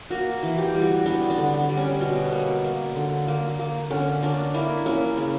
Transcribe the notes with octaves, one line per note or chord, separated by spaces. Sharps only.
A#3 F#4
E3
G4
G3
F#4
B3 D4
D4
D3
D4
G3
C#4
B2
A#3
A#3
D3
A#3
A#3
D3 C#4
A#3 D4
A#3 E4
A#3 C#4
C#3